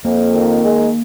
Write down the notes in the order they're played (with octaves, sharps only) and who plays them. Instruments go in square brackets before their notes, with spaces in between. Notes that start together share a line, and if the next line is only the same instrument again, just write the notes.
[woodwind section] F2 [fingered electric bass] A#3
[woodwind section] D#3
G#3